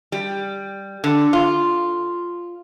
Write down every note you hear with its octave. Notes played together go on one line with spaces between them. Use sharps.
G3
D3
F4